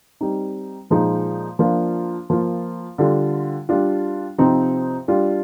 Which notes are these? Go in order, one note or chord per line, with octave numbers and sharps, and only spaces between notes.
G3 C4 D#4
A#2 F3 G#3 D#4
F3 A#3 D4 F4
F3 A#3 F4
D3 G3 D4 F4
G3 D4 F4
C3 F3 C4 D#4
G3 D4 F4